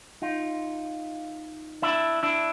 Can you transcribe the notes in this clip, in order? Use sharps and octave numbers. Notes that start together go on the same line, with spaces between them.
D#4 F4
D4 E4
D4 E4